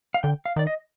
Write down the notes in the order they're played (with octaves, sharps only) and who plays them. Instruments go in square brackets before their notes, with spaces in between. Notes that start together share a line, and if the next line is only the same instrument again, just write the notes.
[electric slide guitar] F5
[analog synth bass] D3 [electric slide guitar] G5
[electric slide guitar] F5
[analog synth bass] D#3 [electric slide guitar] D5
[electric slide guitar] D#5